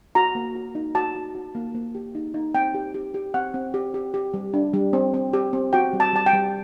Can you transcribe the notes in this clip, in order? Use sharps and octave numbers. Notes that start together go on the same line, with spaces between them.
F#4 A#5
A#3
F#4
D#4
F#4 A5
F#4
F#4
A#3
A#3
G4
D#4
D#4
C4 G5
G4
G4
G4
C4 F#5
C4
G4
G4
G4
G3
D4
G3
C4
C4
G4
C4
F#4 G5
G3
A5
G3 A5
G5
G3